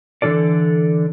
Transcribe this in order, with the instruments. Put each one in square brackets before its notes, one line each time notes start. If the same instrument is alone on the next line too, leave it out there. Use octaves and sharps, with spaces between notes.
[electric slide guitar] D3 E3 F4 A4 D5